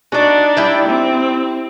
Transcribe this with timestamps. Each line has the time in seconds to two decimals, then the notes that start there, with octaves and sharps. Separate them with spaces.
0.12 D4 D#4 F#4 D5
0.57 G3 E4 G5
0.89 C4